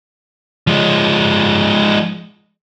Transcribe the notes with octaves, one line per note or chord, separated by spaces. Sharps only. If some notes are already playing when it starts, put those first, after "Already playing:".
F3 G#3